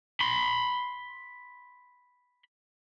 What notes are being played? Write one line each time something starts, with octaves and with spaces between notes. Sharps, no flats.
B5 C6